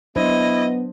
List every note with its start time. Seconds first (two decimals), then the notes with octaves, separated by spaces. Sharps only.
0.16 F#3 B3 D4 E4 C5 D#5